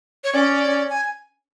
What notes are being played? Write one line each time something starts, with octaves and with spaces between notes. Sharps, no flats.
C#5
C#4 D5
G#5